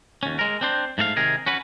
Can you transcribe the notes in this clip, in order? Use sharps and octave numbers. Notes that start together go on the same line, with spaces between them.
D#2 C#4
G#3 A#4
C4 D4 C5
G#2 A3 A4 F5
C3 D#3 G#4 A#4
C#4 F#4 B4